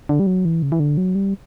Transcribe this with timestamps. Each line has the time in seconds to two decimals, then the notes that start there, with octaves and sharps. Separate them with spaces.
0.09 D3
0.20 G3
0.27 F#3
0.45 E3
0.62 C#3
0.72 E3
0.80 D3
0.97 F#3
1.15 G3